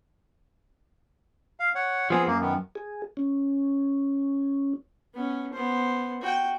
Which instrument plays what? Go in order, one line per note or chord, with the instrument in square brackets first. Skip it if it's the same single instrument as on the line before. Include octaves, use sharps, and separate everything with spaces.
[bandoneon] F5
C#5 F#5
[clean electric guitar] F3 B3 C4 [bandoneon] G#4
[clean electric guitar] F#2 [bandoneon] A#3
[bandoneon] D#3 B3
[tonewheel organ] G#4
C#4
[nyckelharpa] B3 C#4
B3 C5
F#4 G5